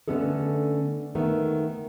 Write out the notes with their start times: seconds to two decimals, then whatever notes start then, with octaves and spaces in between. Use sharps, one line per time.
0.08 D3 A3 B3 C#4 G#4 A4
1.15 D#3 A3 B3